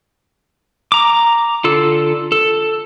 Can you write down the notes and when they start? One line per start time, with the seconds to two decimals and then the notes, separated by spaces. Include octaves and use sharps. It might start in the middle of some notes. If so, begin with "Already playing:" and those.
0.92 A#5 D6
1.64 D3 F4 A4
2.32 A4